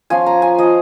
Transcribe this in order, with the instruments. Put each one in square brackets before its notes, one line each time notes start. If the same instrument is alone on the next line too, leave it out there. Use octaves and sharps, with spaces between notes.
[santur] F3 C#4 F4 G#5
A#5
G#5
F3 C#4 F4 D#5